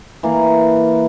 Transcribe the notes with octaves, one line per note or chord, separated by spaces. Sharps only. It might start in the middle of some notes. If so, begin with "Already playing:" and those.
E3 A#3